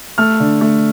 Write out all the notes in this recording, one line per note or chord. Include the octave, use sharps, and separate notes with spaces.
A3 F6
D3
A3